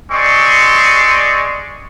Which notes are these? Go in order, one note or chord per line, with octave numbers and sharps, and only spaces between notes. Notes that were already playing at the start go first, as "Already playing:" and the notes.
G#3 C4 D5 C6 C#6